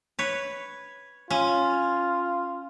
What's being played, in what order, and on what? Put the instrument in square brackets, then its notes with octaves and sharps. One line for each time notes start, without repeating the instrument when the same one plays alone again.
[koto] B4 C#5
[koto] C#4 [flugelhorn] F4